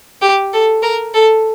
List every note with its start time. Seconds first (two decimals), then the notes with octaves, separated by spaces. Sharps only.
0.22 G4
0.53 A4
0.82 A#4
1.14 A4